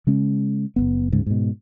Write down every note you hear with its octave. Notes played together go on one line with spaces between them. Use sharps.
C#3 G#3 C#4
F#1 D#2 B3
D2 G#2 C#3
G#2 B2